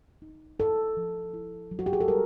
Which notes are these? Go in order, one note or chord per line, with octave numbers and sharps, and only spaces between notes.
D#4
E4 A4
F3
E4
F#3
F#4
G4
G#4
A4
G3 A#4